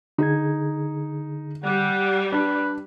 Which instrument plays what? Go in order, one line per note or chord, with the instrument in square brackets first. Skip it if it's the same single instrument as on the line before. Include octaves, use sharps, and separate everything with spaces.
[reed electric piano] D3 G#4 G#6 [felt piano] D#4
[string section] G3 [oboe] F#5
[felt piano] D4 [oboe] B4